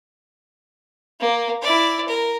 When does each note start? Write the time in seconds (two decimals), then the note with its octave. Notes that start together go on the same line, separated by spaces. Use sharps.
1.20 A#3
1.62 E4 D5
2.08 A#4